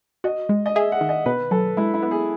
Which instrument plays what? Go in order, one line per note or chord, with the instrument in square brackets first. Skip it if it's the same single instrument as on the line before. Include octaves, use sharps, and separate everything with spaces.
[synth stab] F#4 [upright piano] D#5
[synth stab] G#3
[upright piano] D#5
[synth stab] G#4 [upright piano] E5
[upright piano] F#5
[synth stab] D#3
[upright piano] D#5
[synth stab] B2 [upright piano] B4
[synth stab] F#3 [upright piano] A4
[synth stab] G#3 [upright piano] E4
[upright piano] E4
[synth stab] B3
[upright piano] G#4